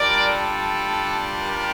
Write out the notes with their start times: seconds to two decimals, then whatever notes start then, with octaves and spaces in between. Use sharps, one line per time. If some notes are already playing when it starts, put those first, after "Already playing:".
Already playing: G3 D4 F4 A#4 D5
0.27 A4
1.40 G4 A#4